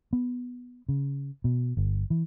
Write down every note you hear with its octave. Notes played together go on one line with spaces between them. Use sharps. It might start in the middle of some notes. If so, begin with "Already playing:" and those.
B3
C#3
B2
G1
E3